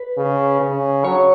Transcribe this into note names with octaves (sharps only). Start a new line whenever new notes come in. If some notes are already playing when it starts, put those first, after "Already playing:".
Already playing: B4
C#3
C#3
F#3 C#5